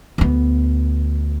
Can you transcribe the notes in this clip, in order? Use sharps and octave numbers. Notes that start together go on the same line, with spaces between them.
D2 B3